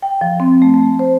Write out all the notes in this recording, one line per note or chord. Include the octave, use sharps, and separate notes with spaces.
G5
F3
C4
A3
A3
C5